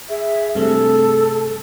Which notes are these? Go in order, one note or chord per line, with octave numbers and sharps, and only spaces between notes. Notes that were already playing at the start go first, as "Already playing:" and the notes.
G#4 E5
G2 C3 A3 A4